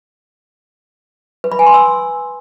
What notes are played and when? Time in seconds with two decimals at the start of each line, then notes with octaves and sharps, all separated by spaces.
1.44 B4
1.52 B5
1.59 G#5
1.67 C6
1.74 E6